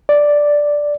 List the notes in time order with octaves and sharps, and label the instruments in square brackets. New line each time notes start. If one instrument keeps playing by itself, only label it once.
[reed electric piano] D5